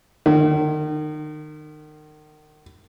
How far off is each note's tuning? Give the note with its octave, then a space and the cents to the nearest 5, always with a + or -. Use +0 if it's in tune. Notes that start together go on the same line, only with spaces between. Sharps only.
D#3 -35